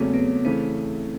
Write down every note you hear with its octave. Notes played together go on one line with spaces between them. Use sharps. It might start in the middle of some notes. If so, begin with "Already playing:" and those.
Already playing: E2 C#3 F#3 A3 A#3 C4 C#4
B3
C#3 E3 A3 C4